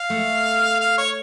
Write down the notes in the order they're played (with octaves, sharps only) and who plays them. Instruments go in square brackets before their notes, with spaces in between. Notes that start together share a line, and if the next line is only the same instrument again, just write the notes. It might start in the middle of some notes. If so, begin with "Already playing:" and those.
Already playing: [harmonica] F5
[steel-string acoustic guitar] A3
[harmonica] F5
C#5